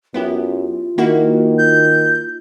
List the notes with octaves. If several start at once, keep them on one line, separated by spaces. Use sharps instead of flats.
F#2 B3 E4 F4 G4
D#3 A#3 E4 F#4
G6